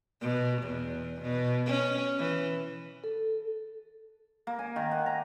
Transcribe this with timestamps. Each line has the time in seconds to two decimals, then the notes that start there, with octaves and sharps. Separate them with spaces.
0.21 B2
0.63 E2
1.22 B2
1.66 C#4
2.19 E3
3.04 A4
4.47 A#3
4.59 G#5
4.76 D#3
4.91 F#5
5.06 A#5